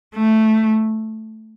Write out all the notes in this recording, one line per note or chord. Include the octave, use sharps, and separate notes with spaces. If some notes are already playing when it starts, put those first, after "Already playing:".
A3